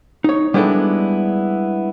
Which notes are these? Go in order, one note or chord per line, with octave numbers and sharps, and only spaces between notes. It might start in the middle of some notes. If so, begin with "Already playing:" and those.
D#4 C#5
G3 G#3 B3 D4 E4 A4